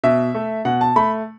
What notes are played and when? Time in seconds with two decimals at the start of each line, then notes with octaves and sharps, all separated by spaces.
0.04 B2 E5
0.35 A3
0.65 B2 F#5
0.81 A5
0.96 A3 B5